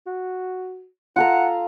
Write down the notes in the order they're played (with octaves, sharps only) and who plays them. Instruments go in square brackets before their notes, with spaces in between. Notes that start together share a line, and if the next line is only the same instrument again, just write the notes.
[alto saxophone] F#4
[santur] F4 A4 A#5 [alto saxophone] F#5